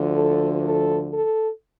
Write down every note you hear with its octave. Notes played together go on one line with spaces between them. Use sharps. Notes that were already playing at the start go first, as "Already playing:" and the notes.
Already playing: D2 D3 F3
A4
A4
A4